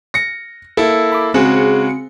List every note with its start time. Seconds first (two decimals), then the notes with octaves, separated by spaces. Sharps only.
0.14 A#6 C#7
0.77 A#3 E4 A4
1.12 B5 D6
1.34 C#3 G#3 C4 F#4 G#4 C#7